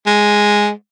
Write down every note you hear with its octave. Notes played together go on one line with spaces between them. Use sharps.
G#3